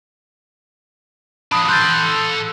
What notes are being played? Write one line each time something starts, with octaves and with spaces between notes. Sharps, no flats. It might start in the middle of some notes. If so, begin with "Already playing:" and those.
F3 D4 B5 D#6
A4 C6 F#6 G6 A6